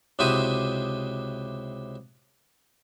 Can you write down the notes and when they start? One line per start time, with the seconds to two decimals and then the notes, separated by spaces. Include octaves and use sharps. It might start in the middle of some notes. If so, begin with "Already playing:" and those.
0.19 C#2 C3 E4 F#4 C5 D#6